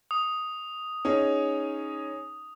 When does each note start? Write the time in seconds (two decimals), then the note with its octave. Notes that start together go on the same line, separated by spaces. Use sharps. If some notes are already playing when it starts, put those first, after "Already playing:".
0.11 D#6
1.05 C#4 D#4 G#4